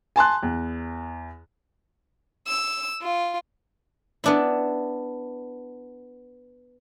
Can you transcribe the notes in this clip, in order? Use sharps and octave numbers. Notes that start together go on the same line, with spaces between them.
G#5 A5 C6 F#6
E2
E6
F4
B3 D4 E4